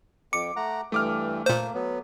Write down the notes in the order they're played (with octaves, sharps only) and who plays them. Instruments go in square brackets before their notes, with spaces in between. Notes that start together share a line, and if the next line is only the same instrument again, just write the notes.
[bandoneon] F2 [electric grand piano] D6 [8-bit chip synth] C#7
[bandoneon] A3 F#5 A#5
[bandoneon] G2 E3 [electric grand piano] A3 D6 F6
[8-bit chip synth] A#2 C5 [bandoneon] A#3
[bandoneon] F#3 B3